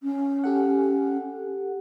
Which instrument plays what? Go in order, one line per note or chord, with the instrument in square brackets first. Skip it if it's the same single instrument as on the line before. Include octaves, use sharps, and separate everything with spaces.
[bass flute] C#4
[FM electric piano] G4 A4 F#5